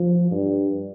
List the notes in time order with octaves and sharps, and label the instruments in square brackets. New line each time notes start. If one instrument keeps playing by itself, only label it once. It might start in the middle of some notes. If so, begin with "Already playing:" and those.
Already playing: [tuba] F3
G2